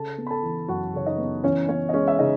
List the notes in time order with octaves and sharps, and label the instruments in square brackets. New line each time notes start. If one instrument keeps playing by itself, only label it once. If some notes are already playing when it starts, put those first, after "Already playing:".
Already playing: [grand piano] C#3 A4 A5
B3
B5
A4 A5
E3
F#2 F#4 F#5
C#3 C#5
D#4 D#5
B3
E3 C#4 C#5
B3 C#4 C#5
D#5
G#3 C#4 C#5
E5
C#3 D#4 D#5